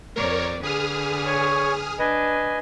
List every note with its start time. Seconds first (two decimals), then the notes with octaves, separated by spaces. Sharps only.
0.16 F2 A#4 C#5 D5
0.63 D3 G#4 B4 D#6 F6
1.26 C#5 C#6
1.99 D4 B4 D#5 G#5